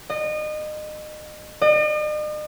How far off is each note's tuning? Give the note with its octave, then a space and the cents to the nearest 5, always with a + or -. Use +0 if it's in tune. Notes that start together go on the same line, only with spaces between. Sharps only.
D#5 -30
D#5 -45